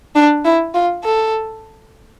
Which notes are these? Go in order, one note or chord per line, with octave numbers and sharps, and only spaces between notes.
D4
E4
F4
A4